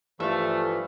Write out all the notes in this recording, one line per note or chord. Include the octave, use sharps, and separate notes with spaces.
G2 E3 F3 A3 E5 F5